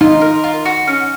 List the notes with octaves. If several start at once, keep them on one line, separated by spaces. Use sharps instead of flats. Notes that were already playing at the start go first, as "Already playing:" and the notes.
D#4 F4
A#4
F4
F#4
C#4